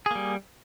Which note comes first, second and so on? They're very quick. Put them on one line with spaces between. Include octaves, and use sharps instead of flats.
G#4 A#3 G3